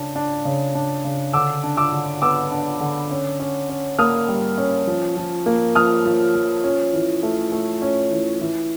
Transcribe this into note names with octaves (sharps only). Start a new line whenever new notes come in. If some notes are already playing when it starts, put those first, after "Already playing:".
Already playing: C#3 D4
D4
C#3
D4
C#3
D3 D6 E6
D4
D6 E6
D3
B3 D6 E6
D4
D3
C#4
C#4
C#4
A#3 D#6 F6
G3
C#4
F3
F3
A#3
F3 D#6 F6
F3
F3
C#4
E3
A3
A3
C#4
E3
E3